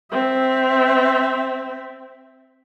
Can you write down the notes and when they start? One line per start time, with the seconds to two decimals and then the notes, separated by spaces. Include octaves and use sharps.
0.12 C4 E5